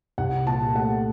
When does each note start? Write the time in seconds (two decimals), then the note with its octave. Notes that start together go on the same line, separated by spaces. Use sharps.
0.18 C2 F#5
0.47 A#2 A5
0.75 A3 F#5